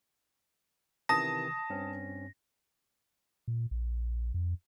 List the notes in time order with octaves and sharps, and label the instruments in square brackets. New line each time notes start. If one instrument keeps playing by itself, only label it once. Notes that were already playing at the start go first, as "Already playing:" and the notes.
[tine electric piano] C3 D#3 E3 [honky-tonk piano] A5 D#6 [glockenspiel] A#6
[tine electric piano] G2 C4 C#4
[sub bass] A#2
A#1
F2